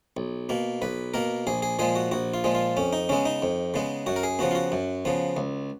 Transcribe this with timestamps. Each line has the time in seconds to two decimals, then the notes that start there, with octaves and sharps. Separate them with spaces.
0.17 B1
0.49 B2 A#3
0.82 B1 B4
1.14 B2 A#3 A#4
1.47 A#1 G#4
1.62 G#4
1.79 A#2 F3 G#3 G#4
1.95 F#4
2.11 A#1 F#4
2.34 F4
2.44 A#2 F3 G#3
2.55 F4
2.77 F2 C#4
2.93 D#4
3.09 C#3 G#3 B3 C#4
3.26 D#4
3.42 F2
3.74 C#3 G#3 B3
4.06 F#2 F#4
4.16 A#4
4.23 G#4
4.39 C#3 F3 B3 F#4
4.51 F4
4.55 F#4
4.72 F#2
5.05 C#3 F3 B3
5.37 C#2